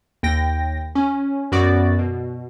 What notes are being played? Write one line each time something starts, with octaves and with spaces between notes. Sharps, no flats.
D#2 G5 A#6
C#4
F#2 B3 F#4 D5 B5 D6
B2